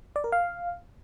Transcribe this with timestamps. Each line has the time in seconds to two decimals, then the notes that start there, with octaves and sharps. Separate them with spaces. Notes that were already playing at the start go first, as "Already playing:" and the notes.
0.16 D5
0.24 A#4
0.32 F5